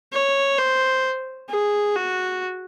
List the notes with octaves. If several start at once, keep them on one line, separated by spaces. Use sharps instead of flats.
C#5
C5
G#4
F#4